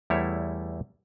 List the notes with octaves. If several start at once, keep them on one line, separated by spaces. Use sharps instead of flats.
E2 G3 A3 E4 C#5